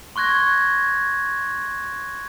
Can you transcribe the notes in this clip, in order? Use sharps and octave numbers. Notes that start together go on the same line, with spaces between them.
C6 C#6 F#6 G#6 A#6